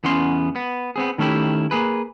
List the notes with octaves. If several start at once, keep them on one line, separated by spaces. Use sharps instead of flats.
E2 B3 C#4 C6
B3
B3 C4 G#4
D#3 A3 C#4 E4 G4
A#3 G#4 B4